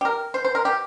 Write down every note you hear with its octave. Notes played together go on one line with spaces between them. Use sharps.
G4
A#4
C5
C5
A#4
G4